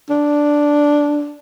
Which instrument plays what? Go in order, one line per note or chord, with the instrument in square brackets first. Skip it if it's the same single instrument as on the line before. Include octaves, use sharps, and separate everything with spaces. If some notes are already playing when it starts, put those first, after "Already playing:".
[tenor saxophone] D4